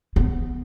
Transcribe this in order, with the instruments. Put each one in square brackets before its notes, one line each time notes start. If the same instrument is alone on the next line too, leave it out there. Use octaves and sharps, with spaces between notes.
[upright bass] B3